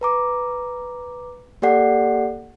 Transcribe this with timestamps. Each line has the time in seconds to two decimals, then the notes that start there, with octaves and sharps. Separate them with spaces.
0.01 B4 A#5 D6
1.62 A#3 G4 A4 D5 F#5 C7